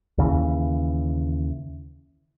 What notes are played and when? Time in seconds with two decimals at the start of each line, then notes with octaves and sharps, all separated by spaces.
0.18 D#2 C#3 E3